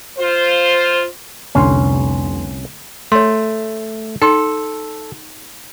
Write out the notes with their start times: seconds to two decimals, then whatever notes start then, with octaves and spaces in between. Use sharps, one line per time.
0.17 F4 C5
1.55 F1 C2 D3 C#4 C6
3.12 A3 C#5 C6
4.22 D#4 A4 G5 C6